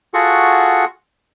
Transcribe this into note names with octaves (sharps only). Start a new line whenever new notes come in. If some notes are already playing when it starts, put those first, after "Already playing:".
F4 F#4 G#4 A4 F#5 C#6